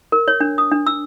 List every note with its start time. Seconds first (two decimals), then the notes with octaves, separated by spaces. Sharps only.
0.12 A#4
0.28 C#5
0.40 D4
0.58 D#6
0.71 D4
0.87 E6